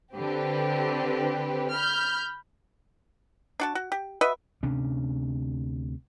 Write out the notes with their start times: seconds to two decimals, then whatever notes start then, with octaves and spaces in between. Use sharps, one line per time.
0.15 D3 C4 G4 B4
1.74 B5 F6 G6
3.60 D4 F#4 A5
3.75 F#4
3.92 G4
4.21 F#4 B4 D#5 E5
4.63 D2 C3 C#4 D4